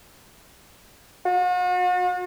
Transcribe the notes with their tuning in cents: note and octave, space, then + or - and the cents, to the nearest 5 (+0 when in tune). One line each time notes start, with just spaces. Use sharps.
F#4 -45